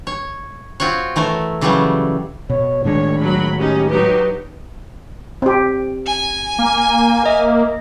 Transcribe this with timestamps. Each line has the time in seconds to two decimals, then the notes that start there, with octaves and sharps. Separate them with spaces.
0.07 C#5
0.80 C4 F4 F#4 C#5
1.16 E3 A3 A#4 C#5
1.61 C#3 E3 F#3 G3 A3 C#4
2.50 B2 C#5
2.84 A2 D#3 G#3 D4 C#5
3.19 F#3 B5
3.59 C#4 D#4 G4
3.90 F#3 D#4 G4 B4
5.42 C4 G4
6.07 G#5
6.58 A#3
7.23 A#4 D#5 E5